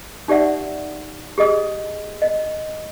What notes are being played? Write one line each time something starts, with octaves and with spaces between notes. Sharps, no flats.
D#4 G4 D5 E5 F#5
G4 G#4 D#5 D#6
D#5